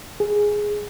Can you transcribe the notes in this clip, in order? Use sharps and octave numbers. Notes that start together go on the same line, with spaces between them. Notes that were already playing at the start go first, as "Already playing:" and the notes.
G#4